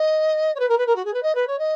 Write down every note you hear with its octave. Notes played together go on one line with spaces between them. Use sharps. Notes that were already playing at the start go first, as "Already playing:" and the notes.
Already playing: D#5
C#5
B4
A#4
B4
A#4
F#4
G#4
B4
D#5
B4
C#5
D#5